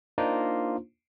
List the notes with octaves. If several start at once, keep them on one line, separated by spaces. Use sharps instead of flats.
A#3 D4 D#4 F4 C5